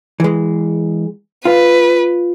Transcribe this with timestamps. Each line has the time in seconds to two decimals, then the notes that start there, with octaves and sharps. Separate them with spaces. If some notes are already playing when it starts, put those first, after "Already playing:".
0.20 E3 G#3
1.45 F4 B4 F5